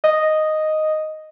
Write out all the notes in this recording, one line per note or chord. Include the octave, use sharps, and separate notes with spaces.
D#5